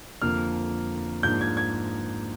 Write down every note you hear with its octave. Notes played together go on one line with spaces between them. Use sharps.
F2 D3 F3 A#3 F6
G#2 F3 A#3 D4 G6
G#6
G#6